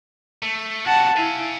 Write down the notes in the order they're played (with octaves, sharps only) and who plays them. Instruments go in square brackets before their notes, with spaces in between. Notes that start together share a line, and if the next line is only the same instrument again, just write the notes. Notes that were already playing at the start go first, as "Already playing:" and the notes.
[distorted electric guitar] A3
[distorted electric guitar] C3 F#4 [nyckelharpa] F#5 A5
[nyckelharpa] E4 [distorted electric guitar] F5 G#5